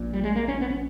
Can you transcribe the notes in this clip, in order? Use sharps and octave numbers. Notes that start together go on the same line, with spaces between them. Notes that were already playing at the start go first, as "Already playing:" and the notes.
Already playing: A#1 A#2
G3
G#3
A#3
C#4
B3
C#4